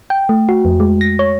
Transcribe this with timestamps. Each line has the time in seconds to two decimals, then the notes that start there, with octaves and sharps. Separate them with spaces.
0.10 G5
0.29 A3
0.49 F#4
0.65 F2
0.80 G#3
1.01 A#6
1.19 C#5